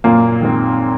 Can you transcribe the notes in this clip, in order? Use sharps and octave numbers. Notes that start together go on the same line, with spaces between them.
F#2 A#2 A#3
D#3 G#3 C4